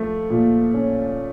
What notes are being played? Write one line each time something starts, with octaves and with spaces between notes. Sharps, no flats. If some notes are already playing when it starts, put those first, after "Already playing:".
Already playing: F3 A3
A#2
C#4